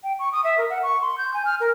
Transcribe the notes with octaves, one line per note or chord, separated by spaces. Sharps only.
G5
C#6
D#6
E5
A#4
F#5
C#6
C6
G6
G#5
F6
A#4